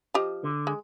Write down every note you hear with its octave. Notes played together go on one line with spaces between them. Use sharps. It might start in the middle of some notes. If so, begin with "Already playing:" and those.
F3 G4 D#5
D3
G#3